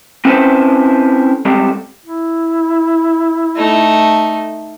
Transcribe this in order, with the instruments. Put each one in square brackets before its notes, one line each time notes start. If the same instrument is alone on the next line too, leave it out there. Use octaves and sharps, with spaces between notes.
[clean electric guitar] C4 C#4 E4 A4 B4 C5
G3 G#3 C4 A4
[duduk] E4
[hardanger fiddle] A3 D#4